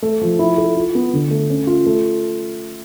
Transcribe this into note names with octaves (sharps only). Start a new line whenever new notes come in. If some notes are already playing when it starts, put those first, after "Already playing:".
A3
F3
E4
A4
F4
B3
D3
A3
C#4
F4
A3